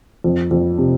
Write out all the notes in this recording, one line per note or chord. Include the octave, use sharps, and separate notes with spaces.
F2
F2
C3